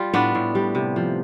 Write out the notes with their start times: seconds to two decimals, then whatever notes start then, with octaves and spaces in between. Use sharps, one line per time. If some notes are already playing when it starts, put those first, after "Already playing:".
Already playing: G3 F4
0.14 A2 B3 D4
0.35 A2
0.55 G3
0.75 C3
0.96 F3